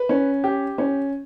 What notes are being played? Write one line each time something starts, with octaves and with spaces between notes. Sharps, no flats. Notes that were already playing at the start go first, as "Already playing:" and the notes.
Already playing: B4
C#4
G4
C#4